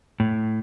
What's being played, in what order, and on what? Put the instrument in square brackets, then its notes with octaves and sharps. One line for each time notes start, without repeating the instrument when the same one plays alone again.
[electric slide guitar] A2